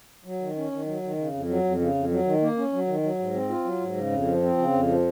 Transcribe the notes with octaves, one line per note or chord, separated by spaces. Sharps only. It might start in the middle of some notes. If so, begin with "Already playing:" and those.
F#3
D#3
C#4
D#3
F#3
D#3
C#3
F2
F#3
F2
C#3
F2
F#3
D#3
A#3
C#4
F#3
D#3
F#3
G#2
C4
F4
F#3
G#2
C#3
F2
F3
C4
C#3
F2
F3